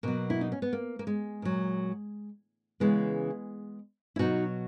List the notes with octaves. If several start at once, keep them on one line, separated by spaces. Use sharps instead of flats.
B2 F#3 A#3
E4
D#4
C#4
B3
A#3
A#3
G#3
A#2 F#3
C#3 E3 G#3 B3
E4
B2 F#3 D#4 F#4